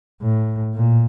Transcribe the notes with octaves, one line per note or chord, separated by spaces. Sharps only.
A2
A#2